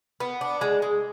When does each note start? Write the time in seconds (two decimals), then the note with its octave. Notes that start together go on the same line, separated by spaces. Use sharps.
0.20 B3
0.41 D4
0.61 G#3
0.82 G#3